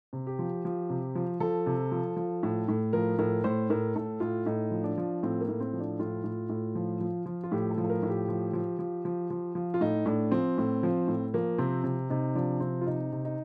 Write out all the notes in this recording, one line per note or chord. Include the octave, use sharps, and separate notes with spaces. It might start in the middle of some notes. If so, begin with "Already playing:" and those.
C3
G4
F3
F3
C3
F3
F3 A4
C3
F3
F3
A2
A2
F3 A#4
A2 A#4
A2 C5
A2 A#4
A2 A4
A2 F4
A2 D#4
F3
D4
F3
A2 C4
A#3
A2
C4
F3
D4
A2 F4
A2
A2
F3
F3
F3
F4
A2 G4
A4
F3
A4
A#4
A2
G4
F3
F3
F3
F3
F3
F3
F4
A2 D#4
A2 D4
F3 C4
A2
F3
A2
F3 A#3
C3 C4
C3
C3 D#4
F3 D4
C3 C4
F4
C3 D#4
C3
D#4